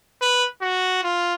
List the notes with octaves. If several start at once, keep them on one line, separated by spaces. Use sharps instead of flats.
B4
F#4
F4